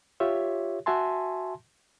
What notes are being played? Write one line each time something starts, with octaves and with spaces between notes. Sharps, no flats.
F4 G4 C#5 E5
F#4 E5 G#5 A5 C6